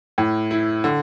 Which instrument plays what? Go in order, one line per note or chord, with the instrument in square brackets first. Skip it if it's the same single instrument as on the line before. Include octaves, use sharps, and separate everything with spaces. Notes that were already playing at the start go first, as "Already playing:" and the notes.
[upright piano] A2
E4
D3